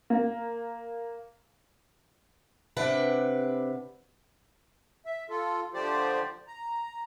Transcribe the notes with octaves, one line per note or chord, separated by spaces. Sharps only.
A#3
C3 D4 B4 F#5
E5
F4 A4
D3 F3 A3 G4 C5 D5
A#5